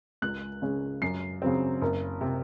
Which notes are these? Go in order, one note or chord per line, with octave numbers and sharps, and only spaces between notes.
C#2 F#6
C#3 G#3 C#4
F#2 C7
C#3 F#3 C4
F#1
C3